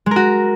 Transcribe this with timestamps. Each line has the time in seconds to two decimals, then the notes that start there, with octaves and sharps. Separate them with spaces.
0.06 G#3
0.11 A#4
0.16 F#4